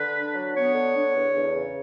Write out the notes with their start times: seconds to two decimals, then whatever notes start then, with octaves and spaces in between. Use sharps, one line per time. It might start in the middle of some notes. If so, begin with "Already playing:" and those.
Already playing: D3 B4
0.14 D4
0.34 F#3
0.53 B3 C#5
0.74 D3
0.95 D4
1.15 E2
1.35 E2
1.55 C#3